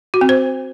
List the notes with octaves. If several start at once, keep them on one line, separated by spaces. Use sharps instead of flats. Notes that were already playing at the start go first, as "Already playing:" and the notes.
F#4
C4
C5